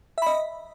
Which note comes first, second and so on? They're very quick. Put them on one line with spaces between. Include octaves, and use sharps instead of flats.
E5 B5 D#5